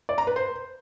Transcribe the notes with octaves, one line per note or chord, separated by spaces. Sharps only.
D5
A#5
B4
C5